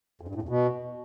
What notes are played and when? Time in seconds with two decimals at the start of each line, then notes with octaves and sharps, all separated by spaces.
0.21 F2
0.28 G2
0.35 A2
0.42 E2
0.49 B2